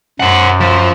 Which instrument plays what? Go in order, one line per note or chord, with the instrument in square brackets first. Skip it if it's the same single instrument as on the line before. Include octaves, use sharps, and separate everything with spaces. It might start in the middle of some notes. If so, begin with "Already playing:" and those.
[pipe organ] F#2 [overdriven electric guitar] C5 F#5
[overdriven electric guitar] F3